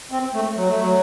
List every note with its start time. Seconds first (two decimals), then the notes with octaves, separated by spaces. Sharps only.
0.12 C4
0.34 A3
0.57 F#3
0.68 A3
0.81 F#3